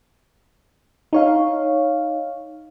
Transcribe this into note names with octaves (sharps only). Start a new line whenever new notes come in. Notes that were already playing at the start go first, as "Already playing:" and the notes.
D#4 C#5 F5